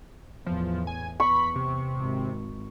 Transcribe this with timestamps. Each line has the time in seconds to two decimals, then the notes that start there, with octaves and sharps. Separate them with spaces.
0.47 E2 A2 F3
0.87 G#5
1.20 E2 B3 B5 C#6
1.56 C3
1.96 G#1